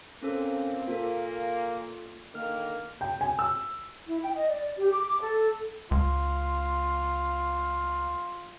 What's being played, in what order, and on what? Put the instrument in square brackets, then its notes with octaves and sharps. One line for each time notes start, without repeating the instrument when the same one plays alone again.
[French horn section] A#2 A#3 C4 [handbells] C#4 A4
[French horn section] A#2 A#3 [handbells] F4 A4
[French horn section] D3 D#3 A#3 [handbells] F6
[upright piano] G5
G#5
E6
[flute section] E4
G5
D#5
D5
G4
D6
A4
[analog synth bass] C#2 [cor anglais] F4